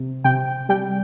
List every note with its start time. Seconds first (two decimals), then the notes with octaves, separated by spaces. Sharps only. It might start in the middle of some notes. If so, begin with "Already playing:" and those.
Already playing: C3
0.24 C3 G5
0.69 G3 G5